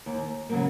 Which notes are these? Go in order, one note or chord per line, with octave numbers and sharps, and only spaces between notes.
D#2
C#3 F#3 A#3